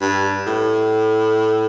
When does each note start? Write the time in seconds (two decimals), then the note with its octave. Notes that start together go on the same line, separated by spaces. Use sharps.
0.01 G2
0.46 A2